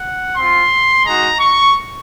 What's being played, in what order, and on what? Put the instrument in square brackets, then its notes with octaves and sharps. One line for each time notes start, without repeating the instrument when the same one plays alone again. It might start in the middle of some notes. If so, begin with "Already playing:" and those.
Already playing: [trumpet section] F#5
C4 F4 C6
G#3 D#4 F#4 A#5
C#6